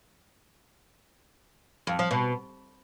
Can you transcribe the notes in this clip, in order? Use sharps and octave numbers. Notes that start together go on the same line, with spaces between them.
F2
F3
B2